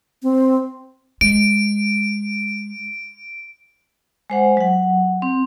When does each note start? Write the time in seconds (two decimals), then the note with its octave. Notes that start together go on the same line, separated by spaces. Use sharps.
0.23 C4
1.21 G#3 D7
4.30 G#3 C5 F#5
4.57 F#3 F#5
5.22 C4